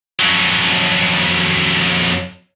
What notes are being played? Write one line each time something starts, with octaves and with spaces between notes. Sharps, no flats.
F2 F#3